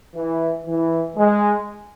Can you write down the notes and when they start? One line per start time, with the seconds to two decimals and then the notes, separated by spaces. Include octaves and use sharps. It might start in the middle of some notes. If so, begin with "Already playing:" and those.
0.15 E3
0.66 E3
1.16 G#3